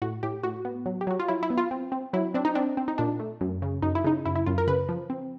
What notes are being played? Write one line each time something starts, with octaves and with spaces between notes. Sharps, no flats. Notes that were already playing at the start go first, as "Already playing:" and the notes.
A2 F#4
A2 G4
A2 F#4
B3
F#3
G4
F#3 F#4
F4
F#3 E4
E4
B3
F4
C4
C4
F#3 E4
C4 D4
D#4
C4 D4
C4
D#4
A#2 D4
A3
F#2
C#3
F#2 D#4
E4
C#3 D#4
F#2 E4
E4
F#2 F4
A#4
C#3 B4
F3
C4